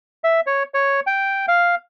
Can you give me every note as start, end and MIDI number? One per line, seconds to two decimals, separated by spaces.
0.24 0.40 76
0.46 0.63 73
0.74 1.00 73
1.07 1.46 79
1.48 1.75 77